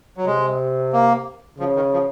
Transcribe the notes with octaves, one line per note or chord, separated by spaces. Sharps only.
F#3
C3 G#3
A#3
C#3 F3
D#3
F3